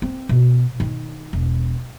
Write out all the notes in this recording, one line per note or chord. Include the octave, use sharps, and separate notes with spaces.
C4
B2
D#3
E1